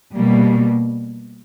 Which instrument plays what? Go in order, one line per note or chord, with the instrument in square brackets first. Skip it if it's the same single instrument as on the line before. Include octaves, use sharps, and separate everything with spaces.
[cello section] B2 G3 A#3